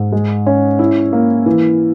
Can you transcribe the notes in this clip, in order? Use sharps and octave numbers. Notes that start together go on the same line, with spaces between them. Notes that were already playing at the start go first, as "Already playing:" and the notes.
Already playing: G#2
G#3
C#4
E4
A#3
E3